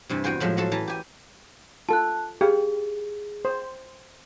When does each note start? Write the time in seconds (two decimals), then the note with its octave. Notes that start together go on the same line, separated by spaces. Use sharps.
0.09 G2 C3 E3
0.24 E2 F#4 G5 G#5 C6
0.40 A2 F3 F#3 G#3
0.57 F#3 C#4 F#4 A4 A5 C6
0.72 E3 A5 A#5
0.88 G4 G#5
1.89 F4 A4 A5 F#6
2.41 G4 G#4 F5
3.45 C5